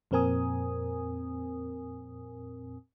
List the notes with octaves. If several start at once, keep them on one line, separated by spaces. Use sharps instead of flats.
F2 A#2 C4 A#4 G#5 D#6